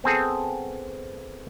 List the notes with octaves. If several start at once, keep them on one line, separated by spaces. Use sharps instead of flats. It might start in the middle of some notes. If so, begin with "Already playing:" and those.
B3 C4 G#4 A4